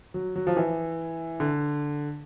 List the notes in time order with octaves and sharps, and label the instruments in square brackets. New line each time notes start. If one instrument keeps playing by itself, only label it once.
[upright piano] F#3
F#3
F3
E3
D3